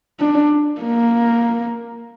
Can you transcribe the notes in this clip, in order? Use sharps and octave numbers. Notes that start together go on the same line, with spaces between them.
D4
A#3